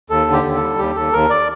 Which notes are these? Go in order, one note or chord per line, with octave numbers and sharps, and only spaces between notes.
D#2 A4
D3
G4
D#2
A4
G3
D#2 G4
D#2 A4
D#2 A#4
D5